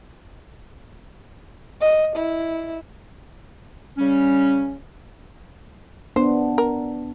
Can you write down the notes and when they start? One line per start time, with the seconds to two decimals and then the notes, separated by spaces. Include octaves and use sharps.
1.81 D#5
2.16 E4
3.98 C#3 G3 C#4
6.16 B3 D4 C5
6.58 A#4